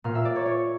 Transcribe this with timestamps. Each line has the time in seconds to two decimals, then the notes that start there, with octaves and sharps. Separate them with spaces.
0.04 A#2 F5
0.15 E5
0.25 D5
0.35 C#5
0.46 C#5